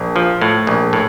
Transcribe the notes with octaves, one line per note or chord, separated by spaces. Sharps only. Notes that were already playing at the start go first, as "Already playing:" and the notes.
Already playing: A#1
F3
A2
A#1
A2